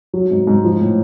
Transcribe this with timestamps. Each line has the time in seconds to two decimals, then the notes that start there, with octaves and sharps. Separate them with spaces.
0.14 F#3
0.31 G#2
0.47 G#2
0.64 F3
0.81 A2